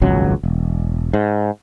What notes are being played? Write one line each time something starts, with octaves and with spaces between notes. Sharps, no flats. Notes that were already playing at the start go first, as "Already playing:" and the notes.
D#1 G#1 C#2 F#3
E1
G#2